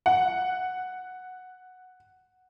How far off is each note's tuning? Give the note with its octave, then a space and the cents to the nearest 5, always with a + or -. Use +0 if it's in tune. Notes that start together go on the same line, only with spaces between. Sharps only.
F#5 +0